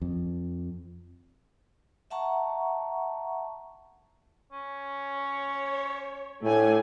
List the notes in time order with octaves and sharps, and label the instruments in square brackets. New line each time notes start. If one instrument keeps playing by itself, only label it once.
[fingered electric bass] F2
[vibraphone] E5 F#5 A5 A#5 C#6
[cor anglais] C#4
[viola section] C#5
[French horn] A2 [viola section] A3 D4 G#5